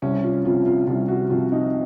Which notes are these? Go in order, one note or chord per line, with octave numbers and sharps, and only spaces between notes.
C2 C#4
F4
C3 F3 F4
F4
C2 F4
F#4
C3 F3 F4
D#4